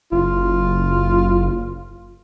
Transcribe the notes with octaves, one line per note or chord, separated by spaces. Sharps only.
F#1 F4